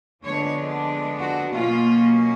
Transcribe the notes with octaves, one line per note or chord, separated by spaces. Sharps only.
D3 F3 G#3 B3 D4 C#5
F#4
B2 F#3 A#3 C#4 F4